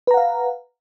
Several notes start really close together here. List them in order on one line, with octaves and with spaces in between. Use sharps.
B4 A#5 F#5 F5